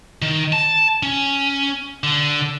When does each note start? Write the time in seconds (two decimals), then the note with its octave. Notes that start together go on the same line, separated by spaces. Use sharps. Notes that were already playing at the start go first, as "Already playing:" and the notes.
0.22 D#3
0.53 A5
1.03 C#4
2.04 D3